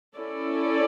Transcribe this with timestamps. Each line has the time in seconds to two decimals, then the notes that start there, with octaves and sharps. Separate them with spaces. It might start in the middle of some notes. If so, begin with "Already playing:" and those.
0.16 C#4 E4 A4 D5